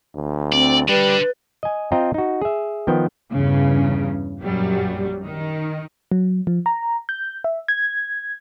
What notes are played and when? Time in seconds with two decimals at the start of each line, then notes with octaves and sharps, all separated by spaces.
0.15 D2
0.53 C4 D5
0.89 D3 G3 D4 B4
1.63 D#5 G#5
1.92 C4 F4 D#5 G5 A#5
2.14 D#4 F#4
2.42 G#4 E5
2.87 D#3 F3 B3 G5
3.30 E2 G2 C#3
4.42 A#1 F#2 F#3 G3
5.25 D#3
6.12 F#3
6.47 F3
6.66 A#5
7.09 G6
7.44 E5
7.68 G#6